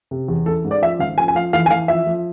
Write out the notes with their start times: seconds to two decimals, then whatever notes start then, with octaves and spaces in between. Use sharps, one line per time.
0.11 C3
0.28 E2
0.46 E3 A4
0.64 G#2
0.71 D5
0.82 F3 E5
0.99 G#1 F5
1.18 F3 G#5
1.28 G#5
1.35 F3 F5
1.53 E3 F5
1.66 G#5
1.71 E3 F5
1.88 F3 E5
2.07 F3